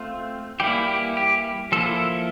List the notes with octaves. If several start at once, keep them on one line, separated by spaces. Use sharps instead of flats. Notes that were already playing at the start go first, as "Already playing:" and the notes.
Already playing: A3 C4 F4
E3 G3 A#3 E4 G4
G4
G4
F3 A#3 E4 A4